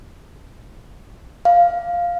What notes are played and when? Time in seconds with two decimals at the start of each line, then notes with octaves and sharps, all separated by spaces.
1.45 F5